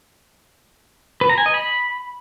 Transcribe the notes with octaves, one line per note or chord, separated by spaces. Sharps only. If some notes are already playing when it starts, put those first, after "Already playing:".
B4
A#5
G#5
D#5
B5